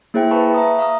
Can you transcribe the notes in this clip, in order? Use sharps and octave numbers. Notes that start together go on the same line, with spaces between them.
A#3 E4 G#4 C5 E5 G5
B4 F5 A5 B5 C#6
E5 A#5 D#6
F5 A#5 D#6